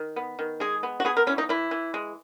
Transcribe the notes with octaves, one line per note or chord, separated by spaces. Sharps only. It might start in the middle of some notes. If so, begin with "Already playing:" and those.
Already playing: D#3
B3
D#3
G#3 G#4
B3
F#4
B3 G#4
A#4
E3 C#4
D#4
E3 E4
E3
G#3